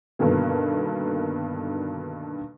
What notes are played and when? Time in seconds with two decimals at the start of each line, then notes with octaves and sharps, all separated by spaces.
0.19 G2 B2 D3 D#3 A#3